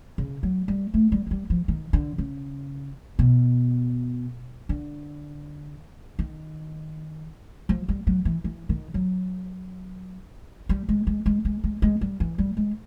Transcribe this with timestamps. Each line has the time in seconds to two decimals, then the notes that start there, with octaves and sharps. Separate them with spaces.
0.18 C#3
0.43 F#3
0.68 G3
0.94 A3
1.12 G3
1.27 G#3
1.31 G3
1.50 F3
1.68 D#3
1.93 D3
2.18 C#3
3.19 B2
4.69 D3
6.19 D#3
7.69 F3
7.88 G3
8.07 F#3
8.25 E3
8.44 E3
8.69 D#3
8.94 F#3
10.69 G3
10.89 G#3
11.07 G#3
11.26 G#3
11.45 G#3
11.64 G#3
11.82 G#3
12.01 G3
12.20 E3
12.38 G3
12.57 G#3